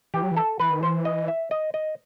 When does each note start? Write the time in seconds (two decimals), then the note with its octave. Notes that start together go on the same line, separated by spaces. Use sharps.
0.14 E3 G4
0.23 F#3
0.31 E3
0.36 A4
0.60 E3 B4
0.70 D#3
0.80 E3 C5
1.05 D#5
1.28 E5
1.51 D#5
1.74 D#5